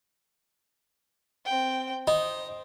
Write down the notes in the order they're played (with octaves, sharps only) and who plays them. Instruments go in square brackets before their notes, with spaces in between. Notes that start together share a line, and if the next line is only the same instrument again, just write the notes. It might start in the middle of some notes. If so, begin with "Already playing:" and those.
[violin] C4 G5
[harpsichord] D#4 [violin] C5 [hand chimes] D#5